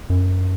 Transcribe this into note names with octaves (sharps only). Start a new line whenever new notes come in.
F#2